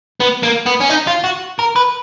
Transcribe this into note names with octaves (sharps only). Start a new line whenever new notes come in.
B3
A#3
B3
C#4
D#4
F4
F#4
A#4
B4